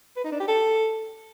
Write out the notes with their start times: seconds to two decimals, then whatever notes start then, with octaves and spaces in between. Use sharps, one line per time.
0.16 B4
0.24 D#4
0.32 D4
0.40 G4
0.48 A4